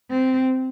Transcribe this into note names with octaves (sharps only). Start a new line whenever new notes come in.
C4